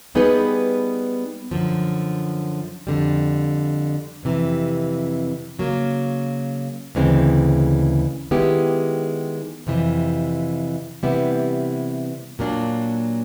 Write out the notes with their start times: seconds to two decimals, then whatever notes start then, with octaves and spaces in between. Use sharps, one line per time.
0.15 G3 B3 D#4 G#4 B4
1.51 F#2 D3 F3
2.87 F2 D3 G3
4.23 F2 C3 E3
5.59 C#3 F#3 A#3
6.95 D2 C#3 E3 G#3 C4
8.31 D#3 G#3 B3 E4 G4
9.67 F2 C3 E3
11.03 C3 E3 G3 B3 E4
12.39 A#2 F#3 A#3 D4